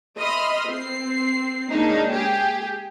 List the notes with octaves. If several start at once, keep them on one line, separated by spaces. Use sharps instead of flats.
D#5 E5 B5 C6 D#6 F6
C4 C7
C#3 G#3 A#3 D4 D#4
G4 G#4